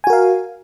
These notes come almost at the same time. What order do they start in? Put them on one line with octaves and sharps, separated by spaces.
G#5 F#4 A#4 F5